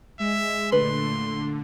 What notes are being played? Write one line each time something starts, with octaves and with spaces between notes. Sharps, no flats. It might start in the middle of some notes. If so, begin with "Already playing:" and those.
G#3 E5
A#2 D3 A3 B4 C6